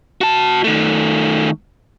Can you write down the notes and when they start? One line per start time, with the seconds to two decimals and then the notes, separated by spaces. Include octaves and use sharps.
0.21 F#4 A5
0.64 D#3 A3